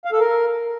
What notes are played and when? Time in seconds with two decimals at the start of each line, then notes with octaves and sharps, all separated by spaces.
0.05 F5
0.12 A4
0.20 A#4